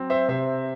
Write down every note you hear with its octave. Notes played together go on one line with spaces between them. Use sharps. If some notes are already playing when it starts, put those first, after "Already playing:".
Already playing: F#3 C4
C5 E5
C3 C5 E5